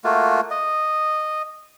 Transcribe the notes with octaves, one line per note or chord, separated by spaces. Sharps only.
A3 A#3 F4 F#4
D#5